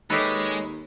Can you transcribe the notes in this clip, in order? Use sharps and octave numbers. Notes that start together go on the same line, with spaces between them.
D#2 G#3 G4 A4 B4 C#5 D#5